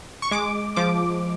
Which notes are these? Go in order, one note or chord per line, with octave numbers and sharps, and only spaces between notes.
C#6
G#3 D6
F3 D6